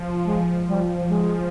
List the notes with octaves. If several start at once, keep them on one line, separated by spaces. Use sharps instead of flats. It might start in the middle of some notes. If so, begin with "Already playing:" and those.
Already playing: F3
G#3
G3
G#3